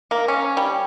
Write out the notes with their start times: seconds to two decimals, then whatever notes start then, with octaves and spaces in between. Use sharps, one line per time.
0.11 A#3
0.28 C#4
0.57 G3